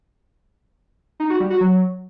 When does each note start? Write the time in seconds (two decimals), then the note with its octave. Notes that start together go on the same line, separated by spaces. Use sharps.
1.20 D#4
1.30 F#4
1.40 G3
1.50 F#4
1.60 F#3